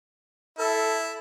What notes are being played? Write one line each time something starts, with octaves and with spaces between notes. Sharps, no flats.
E4 A4